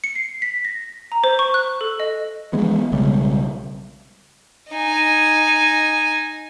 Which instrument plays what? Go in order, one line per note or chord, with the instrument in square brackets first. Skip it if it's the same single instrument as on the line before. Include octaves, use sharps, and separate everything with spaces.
[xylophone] C#7
C7
B6
A#6
A#5
C5
C#6
F#6
A4
D#5
[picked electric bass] E3 F3 G#3 B3
B1 C#3 G3 G#3
[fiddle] D#4 G#5